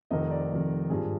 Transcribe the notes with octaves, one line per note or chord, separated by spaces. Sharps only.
F1 F2 D#3 D#5
D5
F1 F2 D#3
G#1 G2 F3 G#4